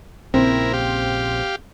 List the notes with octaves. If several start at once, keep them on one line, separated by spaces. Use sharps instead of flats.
A#1 A#2 C#3 C4 E4 A#4
G4 F5